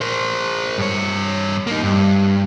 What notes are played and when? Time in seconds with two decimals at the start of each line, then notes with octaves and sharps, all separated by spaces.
0.01 A#4 C5
0.78 G2 C#5
1.67 A#3 D#4
1.83 G2